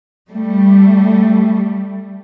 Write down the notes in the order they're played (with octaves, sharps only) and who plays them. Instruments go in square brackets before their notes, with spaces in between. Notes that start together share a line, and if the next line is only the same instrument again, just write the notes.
[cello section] G3 A3